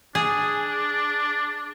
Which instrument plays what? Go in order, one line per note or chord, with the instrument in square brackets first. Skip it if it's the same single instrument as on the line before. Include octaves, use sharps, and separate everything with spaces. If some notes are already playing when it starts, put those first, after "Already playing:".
[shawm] D4 [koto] G#4